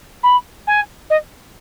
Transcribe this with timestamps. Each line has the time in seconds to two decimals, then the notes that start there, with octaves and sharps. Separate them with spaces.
0.23 B5
0.67 G#5
1.10 D#5